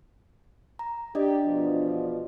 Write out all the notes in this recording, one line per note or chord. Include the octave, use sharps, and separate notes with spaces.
A#5
D4 G4 D5 D#5
E2 B2 F3